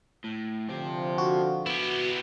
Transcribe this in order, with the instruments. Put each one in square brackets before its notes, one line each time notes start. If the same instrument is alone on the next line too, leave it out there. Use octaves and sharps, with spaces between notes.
[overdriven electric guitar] A2
[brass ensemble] D3 F3 [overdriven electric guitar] C4 G4
[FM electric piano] F#4
[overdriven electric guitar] B3 [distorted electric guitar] E4 G4